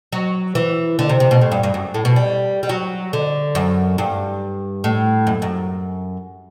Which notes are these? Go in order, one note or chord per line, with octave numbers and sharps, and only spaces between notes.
F#3
E3
D3
C3
C3
B2
A2
G2
G2
F#2
A2
B2
G3
G3
F#3
D3
F#2
G2
A2
F#2
F#2